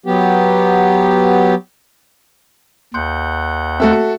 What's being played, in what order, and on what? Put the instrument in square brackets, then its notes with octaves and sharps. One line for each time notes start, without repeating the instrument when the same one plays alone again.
[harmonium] F#3 B3 G4
[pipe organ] D#2 F#5 G6 [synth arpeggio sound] C6
[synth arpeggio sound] A3 C4 [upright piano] F#4 A4 E5